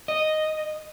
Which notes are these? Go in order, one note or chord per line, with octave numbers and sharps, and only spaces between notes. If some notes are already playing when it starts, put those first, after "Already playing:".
D#5